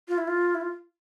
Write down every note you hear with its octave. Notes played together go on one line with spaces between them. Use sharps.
F4
E4
F4
E4
F4